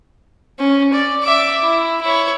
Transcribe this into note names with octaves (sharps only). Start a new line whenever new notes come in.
C#4
D5
E5 D6
E4
E4 C#5